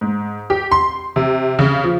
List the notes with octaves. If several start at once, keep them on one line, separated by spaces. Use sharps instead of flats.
G#2
G4
C6
C3
C#3
F3